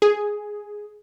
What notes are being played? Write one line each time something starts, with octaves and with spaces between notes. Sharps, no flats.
G#4